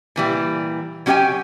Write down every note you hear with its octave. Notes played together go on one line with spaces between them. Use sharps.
A#2 E3 G3
F#3 C#4 G4 D5 G5 G#5